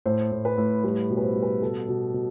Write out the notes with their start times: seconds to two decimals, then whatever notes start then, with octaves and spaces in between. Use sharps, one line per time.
0.06 A2 C5
0.32 A2
0.45 B4
0.58 A2
0.84 G3 B4
1.10 B2
1.17 B4
1.23 C5
1.36 G3
1.42 B4
1.62 B2 A4
1.88 B2
2.14 B2